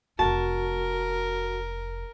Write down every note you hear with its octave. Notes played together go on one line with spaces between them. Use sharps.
F1 A3 F#4 A#4 A5